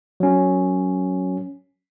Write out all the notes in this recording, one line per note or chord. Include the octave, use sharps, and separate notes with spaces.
F#3 C#4